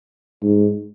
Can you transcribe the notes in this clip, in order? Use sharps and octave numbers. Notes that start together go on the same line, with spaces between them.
G#2